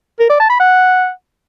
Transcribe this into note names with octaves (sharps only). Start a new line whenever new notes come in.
A#4
D5
A5
B5
F#5